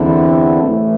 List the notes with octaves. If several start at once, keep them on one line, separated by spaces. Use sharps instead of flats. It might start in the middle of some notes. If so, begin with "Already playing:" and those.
Already playing: E2 D3 C4 E4
A1 A2 E3 A3